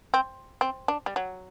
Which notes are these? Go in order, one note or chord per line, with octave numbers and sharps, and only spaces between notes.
C4
C4
D4
G3
F#3